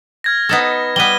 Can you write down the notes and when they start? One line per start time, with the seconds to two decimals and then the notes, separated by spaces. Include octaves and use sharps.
0.24 F6 G#6 A#6
0.49 B3 D#4 A4
0.96 G3 B3 D#7 G7